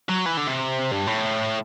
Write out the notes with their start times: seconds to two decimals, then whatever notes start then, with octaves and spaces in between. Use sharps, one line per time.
0.09 F#3
0.26 E3
0.37 D3
0.47 C3
0.91 G2
1.07 A2